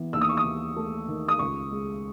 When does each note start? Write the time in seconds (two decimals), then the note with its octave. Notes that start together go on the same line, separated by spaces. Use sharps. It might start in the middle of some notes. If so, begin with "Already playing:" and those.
Already playing: E3 B3
0.13 D#2 E6
0.21 D#6
0.29 C#6
0.37 D#6
0.45 D#2
0.76 A3
1.08 D#3
1.28 D#6
1.39 C#2 C#6
1.71 G#3